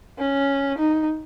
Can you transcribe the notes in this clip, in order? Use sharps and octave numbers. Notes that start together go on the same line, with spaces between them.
C#4
D#4